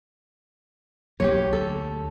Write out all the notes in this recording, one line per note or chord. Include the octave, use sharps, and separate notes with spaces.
B1 F#3 A#3 G4 C#5
D2 A4